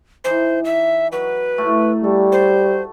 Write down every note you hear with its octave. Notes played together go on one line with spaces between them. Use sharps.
E3 D#4 C5
E5
F#3 B4
A2 A3
G3 A4
C5